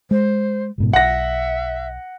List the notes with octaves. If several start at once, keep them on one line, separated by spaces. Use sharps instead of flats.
G#3 C5
G#1 G#2 B2
B1 E5 F#5 A#6